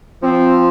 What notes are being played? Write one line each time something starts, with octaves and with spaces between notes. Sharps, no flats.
F3 C4